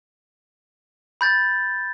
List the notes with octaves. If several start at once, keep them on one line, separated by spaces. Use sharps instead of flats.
B5 G6 A6